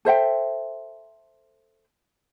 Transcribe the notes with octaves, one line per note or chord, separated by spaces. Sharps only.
A4 C5 E5 G5